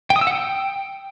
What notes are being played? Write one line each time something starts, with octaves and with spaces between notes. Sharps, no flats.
G5
D#6
E6
F#5
G5